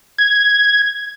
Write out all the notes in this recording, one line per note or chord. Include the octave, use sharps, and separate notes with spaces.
G#6